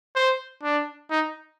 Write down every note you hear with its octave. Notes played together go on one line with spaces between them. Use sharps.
C5
D4
D#4